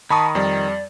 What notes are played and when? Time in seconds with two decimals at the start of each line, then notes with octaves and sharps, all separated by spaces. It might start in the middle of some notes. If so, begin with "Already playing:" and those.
0.11 D#3 A5 B5 C#6 D#6
0.35 F2 G3 D5